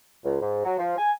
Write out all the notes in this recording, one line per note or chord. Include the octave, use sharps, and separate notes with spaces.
C#2
G#2
F#3
F3
G#5